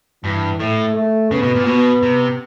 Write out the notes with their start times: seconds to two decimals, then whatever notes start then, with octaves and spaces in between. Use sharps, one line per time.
0.24 G2 E3
0.59 A2 A3
0.96 A3
1.31 C#3 B3
1.43 B2
1.55 A#2
1.66 B2 B3
2.02 C3